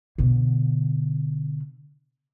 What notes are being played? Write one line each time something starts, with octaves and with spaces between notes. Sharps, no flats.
B2 D3